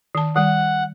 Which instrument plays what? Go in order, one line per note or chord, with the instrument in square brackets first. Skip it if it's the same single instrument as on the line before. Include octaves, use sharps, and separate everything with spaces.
[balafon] D#3 A5
[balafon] D#3 G3 [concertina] F#5